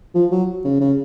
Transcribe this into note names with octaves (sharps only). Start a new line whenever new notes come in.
F3
F#3
C#3
C#3